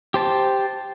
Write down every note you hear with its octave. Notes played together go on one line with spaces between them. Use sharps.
G4 C5 A5